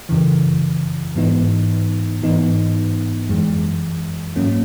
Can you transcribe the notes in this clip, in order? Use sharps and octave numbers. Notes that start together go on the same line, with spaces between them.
F#2 C#3 E3
G#2 E3 B3 D#4
G#2 E3 B3 D#4
F#2 E3 G#3
G#2 F#3 A#3 C#4